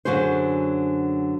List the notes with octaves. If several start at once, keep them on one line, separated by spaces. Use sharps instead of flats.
F#2 D3 F#3 F#4 G#4 C5